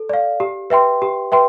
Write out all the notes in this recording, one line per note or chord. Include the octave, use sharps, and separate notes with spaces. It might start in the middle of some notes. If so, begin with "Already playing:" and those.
Already playing: A4
D5 F5
G4
B4 E5 G5 C6
G4
B4 E5 G5 C6